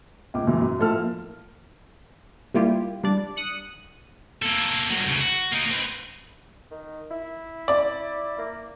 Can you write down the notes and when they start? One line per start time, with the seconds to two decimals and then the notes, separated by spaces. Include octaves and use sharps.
0.34 C#2 A#2 D6
0.47 F#2 A#2 E3
0.60 F#2
0.78 A2 F3 A4 F6
0.92 A#3
2.54 G3 A#3 E4 F4 G4
3.04 G3 D4 D5
3.36 D#6 F#6 C#7
4.42 A#3 A4
4.90 G2 F#3
5.06 D2 C#3
5.20 F#4
5.52 A#3 D#4
5.71 C4 B4
6.71 D#3
7.11 E4
7.68 D5
8.38 A#3